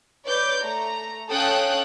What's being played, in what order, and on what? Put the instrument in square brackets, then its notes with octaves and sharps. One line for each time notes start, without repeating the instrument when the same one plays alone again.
[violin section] B4 C#5 D5 D6 G6
A3 A#5
C#4 A4 F5 G5 D#6 F#6